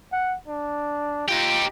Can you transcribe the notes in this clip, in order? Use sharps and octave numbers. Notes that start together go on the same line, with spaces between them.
F#5
D4
D#4 F4 G4